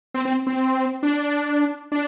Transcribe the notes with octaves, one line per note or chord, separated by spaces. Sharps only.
C4
C4
C4
D4
D4